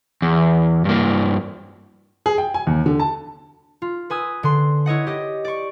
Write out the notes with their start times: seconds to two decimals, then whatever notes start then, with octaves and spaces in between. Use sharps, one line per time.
0.22 E2
0.85 G2 A#3
2.26 G#4
2.38 G5
2.54 G#5
2.67 D#2
2.86 D3
3.00 A5
3.82 F4
4.10 B4 G#5 D#6 E6
4.43 D3 C6
4.86 E4 C#5 D#5 F#5
5.07 G4 D#5
5.45 D5 C#6